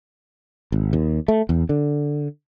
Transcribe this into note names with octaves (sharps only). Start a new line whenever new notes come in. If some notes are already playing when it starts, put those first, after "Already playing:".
G#1
D#2
A3
E2
D3